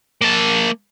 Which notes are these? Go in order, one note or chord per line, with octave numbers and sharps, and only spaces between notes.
A#3 A5